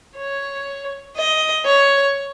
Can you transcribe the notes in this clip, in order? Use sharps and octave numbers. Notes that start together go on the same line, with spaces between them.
C#5
D#5
C#5